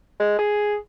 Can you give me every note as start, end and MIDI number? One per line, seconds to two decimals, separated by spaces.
0.20 0.38 56
0.39 0.76 68